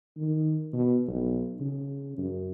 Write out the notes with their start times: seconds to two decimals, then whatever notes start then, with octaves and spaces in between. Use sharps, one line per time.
0.17 D#3
0.73 B2
1.08 B1
1.60 C#3
2.18 F#2